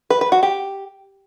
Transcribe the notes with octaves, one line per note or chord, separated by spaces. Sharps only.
B4
B4
F#4
G4